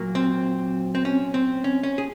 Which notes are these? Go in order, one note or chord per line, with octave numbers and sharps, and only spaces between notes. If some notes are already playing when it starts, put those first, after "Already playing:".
Already playing: A#2 F#3 A#3
C4
C4
C#4
C4
C#4
C#4
G#4